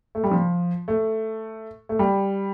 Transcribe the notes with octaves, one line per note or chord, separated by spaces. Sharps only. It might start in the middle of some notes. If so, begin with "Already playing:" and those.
A3
G3
F3
A3
A3
G3